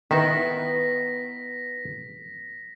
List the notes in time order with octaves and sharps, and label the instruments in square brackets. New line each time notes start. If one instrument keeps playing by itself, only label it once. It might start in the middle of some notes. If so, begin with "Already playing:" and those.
[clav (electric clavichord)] D#3 [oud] B3 D#4 E4 [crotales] A#6 B6